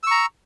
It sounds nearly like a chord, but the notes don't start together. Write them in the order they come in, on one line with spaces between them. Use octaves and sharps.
E6 C#6 A#5